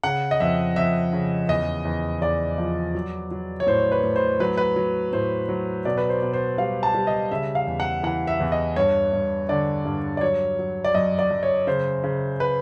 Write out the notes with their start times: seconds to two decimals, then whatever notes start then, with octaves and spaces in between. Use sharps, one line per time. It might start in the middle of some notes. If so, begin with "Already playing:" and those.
0.04 C#3 F#5
0.31 D#5
0.40 F2 E5
0.76 F2 E5
1.13 C#3
1.49 E2 D#5
1.85 E2
2.21 E2 D5
2.58 F3
2.95 F#3
3.31 F#3
3.60 C#5
3.67 A2 C5
3.92 B4
4.03 A2
4.16 C5
4.40 F#3 B4
4.57 B4
4.76 F#3
5.13 A2 C5
5.49 F#3
5.85 B2 D5
5.98 B4
6.09 C5
6.22 B2
6.33 C5
6.58 G3 F5
6.83 A5
6.94 G3
7.07 D#5
7.31 C#3 E5
7.55 F5
7.67 E2
7.80 F#5
8.03 E3 F#5
8.27 E5
8.40 E2
8.52 D#5
8.76 G2 C#5
9.13 G2
9.49 D3 D5
9.85 G2
10.17 D5
10.21 F#3 C#5
10.59 F#3
10.84 D5
10.94 F#2 D#5
11.19 D5
11.31 F#2
11.43 C#5
11.67 C#3 C5
12.04 C#3
12.40 B4